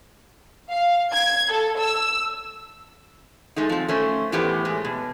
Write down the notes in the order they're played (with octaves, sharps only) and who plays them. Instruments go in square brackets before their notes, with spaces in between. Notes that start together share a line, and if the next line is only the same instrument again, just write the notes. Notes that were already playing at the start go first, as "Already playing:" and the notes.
[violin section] F5
G#6
A4
E6
[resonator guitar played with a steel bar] G#3 A3 D#4
F3 C4
A3 C#4 C5
A2 E3 B3 C#4 G4 C5
G#3 A3
B2